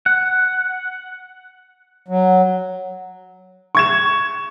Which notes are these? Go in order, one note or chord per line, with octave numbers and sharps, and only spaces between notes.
F#5
F#3
C#6 G#6 E7